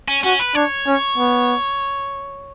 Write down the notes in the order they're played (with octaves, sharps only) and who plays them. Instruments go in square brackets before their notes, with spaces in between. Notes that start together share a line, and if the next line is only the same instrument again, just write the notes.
[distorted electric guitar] C#4
[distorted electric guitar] C#4 [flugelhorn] F#4
[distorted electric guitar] B4
[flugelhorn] D4 [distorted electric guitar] C#5
[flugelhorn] C#4
B3